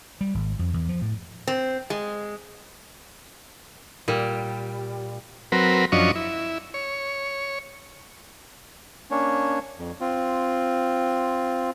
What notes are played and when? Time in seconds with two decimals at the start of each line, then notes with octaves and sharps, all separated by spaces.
0.21 G3
0.34 G#1
0.59 F2
0.74 E2
0.89 F3
1.01 A2
1.47 C4
1.90 G#3
4.08 A#2 G3
5.52 F#3 C4 A#4 B4
5.92 F#2 F3 C#4 D4 D#5 C#6
6.16 E4
6.74 C#5
9.11 A#3 C#4 D4 C#5
9.78 F2
10.01 C4 F4